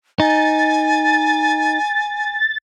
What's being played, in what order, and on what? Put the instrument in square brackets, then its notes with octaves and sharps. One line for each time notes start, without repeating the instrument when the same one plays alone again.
[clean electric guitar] D#4 [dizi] G#5 [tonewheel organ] A6